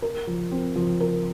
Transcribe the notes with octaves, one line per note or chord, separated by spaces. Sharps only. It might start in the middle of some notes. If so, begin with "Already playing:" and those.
A#4
F3
C4
F3
A#4